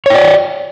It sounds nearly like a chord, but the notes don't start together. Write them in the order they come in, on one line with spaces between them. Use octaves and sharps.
C#5 G5 D5